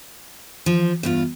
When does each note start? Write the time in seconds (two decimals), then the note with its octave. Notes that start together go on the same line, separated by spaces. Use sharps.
0.66 F3
1.03 E2 G2 F4